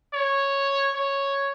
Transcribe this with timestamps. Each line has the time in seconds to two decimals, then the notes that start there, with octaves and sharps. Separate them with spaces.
0.13 C#5
0.94 C#5